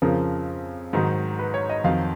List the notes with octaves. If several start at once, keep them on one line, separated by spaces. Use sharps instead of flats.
F2 C#3 F3 A#4
G#2 D#3 F#3
B4
C#5
D#5
F2 D#3 F#3 F5